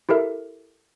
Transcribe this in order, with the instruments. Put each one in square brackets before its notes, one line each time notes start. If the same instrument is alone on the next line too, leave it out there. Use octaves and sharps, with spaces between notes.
[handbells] E4 G4 A4 A#4 E5